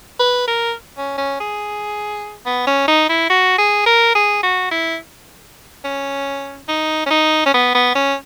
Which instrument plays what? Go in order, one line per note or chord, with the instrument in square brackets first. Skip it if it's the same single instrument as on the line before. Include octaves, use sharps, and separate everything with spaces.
[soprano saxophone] B4
A#4
C#4
C#4
G#4
B3
C#4
D#4
E4
F#4
G#4
A#4
G#4
F#4
E4
C#4
D#4
C#4
D#4
C#4
B3
B3
C#4